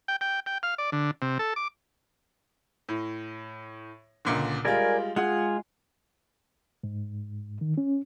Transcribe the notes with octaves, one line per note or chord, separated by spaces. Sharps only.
G5
G5
G5
F5
D5
D3
C3
A4
D6
A2
C#2 A#2 D3
G3 G#3 F4 A#4 D5 G#5
G#3 F4 G#4 F#5
G#2
D#3
C#4